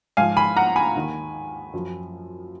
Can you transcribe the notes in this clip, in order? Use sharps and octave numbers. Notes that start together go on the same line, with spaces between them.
G#2 F3 F5 G#5
G#5 B5
F#5 A#5
G#5 B5
D#2 D#3
F#2 F3